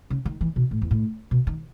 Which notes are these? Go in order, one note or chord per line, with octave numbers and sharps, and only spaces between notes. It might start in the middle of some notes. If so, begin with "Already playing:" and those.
C#3
D#3
E3
B2
A2
E2
A2
B2
D#3